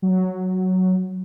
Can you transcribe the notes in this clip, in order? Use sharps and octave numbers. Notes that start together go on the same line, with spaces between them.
F#3